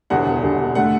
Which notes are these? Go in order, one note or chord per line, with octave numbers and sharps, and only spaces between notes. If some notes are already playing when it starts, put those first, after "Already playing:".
E1 E2 D3 G3 F#5
E1 E2 D3 G3
D3 A3 F#5